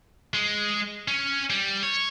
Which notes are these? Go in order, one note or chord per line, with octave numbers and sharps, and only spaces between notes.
G#3
C#4
G3
C#5